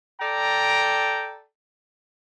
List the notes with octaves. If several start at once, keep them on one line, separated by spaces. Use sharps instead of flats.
A4 D5 G5 A#5